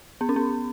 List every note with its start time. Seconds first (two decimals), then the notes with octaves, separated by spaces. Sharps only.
0.21 B3
0.29 C#4
0.36 B3